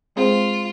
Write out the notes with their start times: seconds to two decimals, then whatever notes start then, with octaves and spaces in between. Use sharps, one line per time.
0.16 G#3 C4 F4 G#4 C5